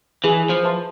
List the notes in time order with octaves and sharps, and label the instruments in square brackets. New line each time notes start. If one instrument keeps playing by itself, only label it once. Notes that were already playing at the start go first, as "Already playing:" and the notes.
[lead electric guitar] E3 [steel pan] G#4
[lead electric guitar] F3
[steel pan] B4 E5 A5 C6